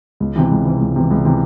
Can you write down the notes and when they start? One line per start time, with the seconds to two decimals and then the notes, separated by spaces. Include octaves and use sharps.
0.20 C#2
0.36 C3 E3
0.51 C#2
0.65 C3 E3
0.80 C#2
0.96 C3 E3
1.11 C#2
1.25 C3 E3